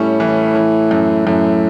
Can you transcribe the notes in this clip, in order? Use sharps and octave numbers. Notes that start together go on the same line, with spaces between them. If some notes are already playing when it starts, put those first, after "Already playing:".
Already playing: A2 G3 C#4
E3
E3
F#2
F#2 A2